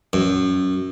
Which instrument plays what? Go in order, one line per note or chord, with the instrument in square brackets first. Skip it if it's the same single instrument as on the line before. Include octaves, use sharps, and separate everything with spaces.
[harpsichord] F#2